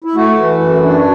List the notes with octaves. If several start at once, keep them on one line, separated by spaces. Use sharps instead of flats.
E4
A3 F#4
E3
F#2
D4